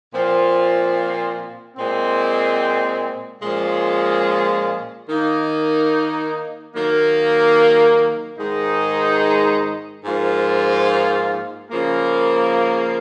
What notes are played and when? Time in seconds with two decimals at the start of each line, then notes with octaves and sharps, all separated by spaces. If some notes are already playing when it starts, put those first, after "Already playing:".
0.12 A#2 F3 C4 F4
1.77 A#2 G#3 C4
3.42 A#2 F3 G#3 C#4 F4
5.07 D#3 A#3 D#4
6.73 D#3 F#3 A#3
8.38 G#2 D#3 G#3 D#4
10.05 G#2 F3 A#3 F4
11.70 C#3 F3 A#3